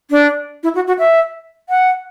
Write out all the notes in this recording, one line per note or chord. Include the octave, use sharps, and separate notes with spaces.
D4
E4
F#4
F#4
E5
F#5